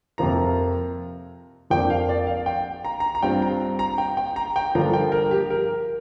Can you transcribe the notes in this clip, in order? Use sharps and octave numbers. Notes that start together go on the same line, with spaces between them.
F2 C3 F3 A#3 F4 A#5
F2 F3 A#3 D4 G5
F5
D5
F5
G5
A#5
A#5
A#5
G2 G3 C4 F4 G5
A#5
A#5
G5
G5
A#5
G5
G2 D3 F3 A#3 F4 A#5
G5
A#4
G4
A#4